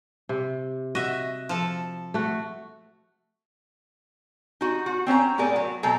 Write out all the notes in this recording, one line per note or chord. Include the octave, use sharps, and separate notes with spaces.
C3
F#4 D#5 E5
F3 A4
A3 F#4
D#4 F#4
F#4
C4 C#4 C5 A#5
A2 B3 G#4 A#4 D5
F#3
B2 F#3 G#3 A4 C5 A#5